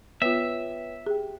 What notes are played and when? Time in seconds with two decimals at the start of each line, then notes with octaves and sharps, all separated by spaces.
0.22 B3 F4 B4 C#5 E5 G5
1.06 G4 G#4 G5